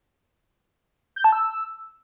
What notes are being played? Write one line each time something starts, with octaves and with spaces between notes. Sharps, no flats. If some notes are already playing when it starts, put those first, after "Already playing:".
G6
A5
E6